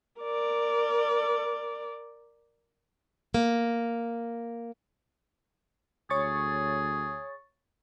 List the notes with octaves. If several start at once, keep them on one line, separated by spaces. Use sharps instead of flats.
A#4 D5
A#3
D2 G#4 C#5 C#6 A6